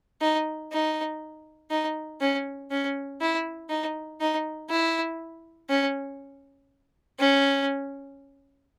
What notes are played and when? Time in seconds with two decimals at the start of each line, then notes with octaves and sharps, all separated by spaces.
0.21 D#4
0.72 D#4
1.70 D#4
2.20 C#4
2.71 C#4
3.21 E4
3.70 D#4
4.20 D#4
4.70 E4
5.69 C#4
7.19 C#4